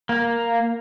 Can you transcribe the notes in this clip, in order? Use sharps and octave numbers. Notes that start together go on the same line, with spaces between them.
A#3